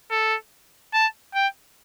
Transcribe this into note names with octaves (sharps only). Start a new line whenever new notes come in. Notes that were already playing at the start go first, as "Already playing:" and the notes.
A4
A5
G5